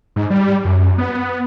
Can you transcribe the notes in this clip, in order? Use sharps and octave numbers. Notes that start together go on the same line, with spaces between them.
G#2
G3
F#2
B3